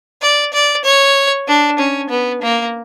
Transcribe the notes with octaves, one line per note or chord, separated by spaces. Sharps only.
D5
D5
C#5
D4
C#4
B3
A#3